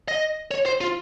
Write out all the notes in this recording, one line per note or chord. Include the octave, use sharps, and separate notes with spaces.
D#5
C#5
C5
F4